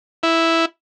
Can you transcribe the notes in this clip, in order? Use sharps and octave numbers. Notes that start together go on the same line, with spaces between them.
E4